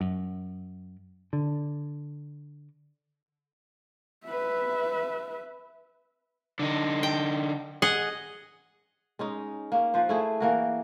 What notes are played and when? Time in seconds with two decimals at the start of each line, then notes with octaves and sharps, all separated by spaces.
0.01 F#2
1.33 D3
4.26 B4 E5
6.59 D3 D#4
7.03 G5
7.82 G#4 D#5 F#5
9.19 G#3 C#4 D#4
9.72 A#3 C#4
9.94 F3 B4 C5
10.09 A3 E4 G#4
10.40 E3 A#3 F#4